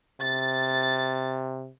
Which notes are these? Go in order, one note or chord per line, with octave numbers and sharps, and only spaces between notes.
C3 A6